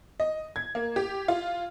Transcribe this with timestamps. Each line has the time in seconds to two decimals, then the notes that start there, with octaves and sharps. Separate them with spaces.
0.20 D#5
0.56 G#6
0.75 A#3
0.96 G4
1.28 F4